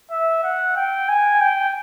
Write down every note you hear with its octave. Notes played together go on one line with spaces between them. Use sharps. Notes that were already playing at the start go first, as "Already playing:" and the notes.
E5
F#5
G5
G#5
G5